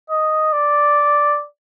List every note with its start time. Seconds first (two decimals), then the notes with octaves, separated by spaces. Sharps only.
0.10 D#5
0.52 D5